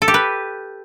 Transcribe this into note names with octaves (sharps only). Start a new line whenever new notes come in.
A4
G4
B4